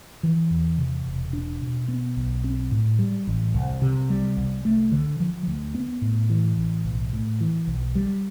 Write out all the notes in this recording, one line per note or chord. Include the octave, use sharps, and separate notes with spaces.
E3
E2
C3
E1
D4
B2
B3
B1
C4
A2
G3
A1
C2
C3
G3
C2
A3
D3
F3
D2
B3
A2
E3
A1
B1
A2
E3
B1
G3